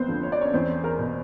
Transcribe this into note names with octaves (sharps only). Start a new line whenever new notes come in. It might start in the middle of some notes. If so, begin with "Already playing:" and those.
Already playing: F2 B3 C4 B4 C5
D3 F3
C#5
D5
C#4 C#5
E2 C4 C5
A#4
B2